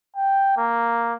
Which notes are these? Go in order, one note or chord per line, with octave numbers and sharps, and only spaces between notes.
G5
A#3